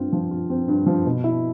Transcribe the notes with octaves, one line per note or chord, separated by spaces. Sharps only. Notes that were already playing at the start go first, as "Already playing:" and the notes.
Already playing: G2 C4 F4
F3
F4
C4
G2
F3
B2
E4